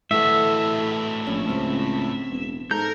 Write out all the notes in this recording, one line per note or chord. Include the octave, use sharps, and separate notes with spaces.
A2 E3 A3 F#4 A4 E5
A#1 C#4
C#2 C4
E1
G#2 A4 A#4 G6